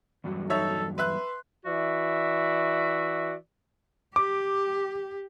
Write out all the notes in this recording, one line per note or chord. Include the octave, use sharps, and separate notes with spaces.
E2 G2 F#3
D#4 A4 C#5 E5
B4 E5 C6 F#6
E3 F#4 D5 E5
G4 D6